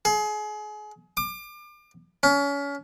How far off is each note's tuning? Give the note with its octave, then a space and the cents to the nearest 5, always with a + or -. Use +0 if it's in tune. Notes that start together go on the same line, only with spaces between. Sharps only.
G#4 +30
D6 +35
C#4 +30